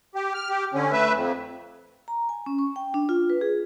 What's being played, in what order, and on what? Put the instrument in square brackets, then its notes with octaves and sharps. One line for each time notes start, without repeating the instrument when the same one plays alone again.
[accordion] G4
F6
G4
D3 C#4
A3 B4 E5
F2
[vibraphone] A#5
G#5
C#4
C#6
G5
D4
F4
B4
G#4